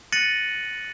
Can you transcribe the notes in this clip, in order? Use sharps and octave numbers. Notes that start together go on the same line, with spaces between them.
F#6 A6 A#6 C#7 D#7 F#7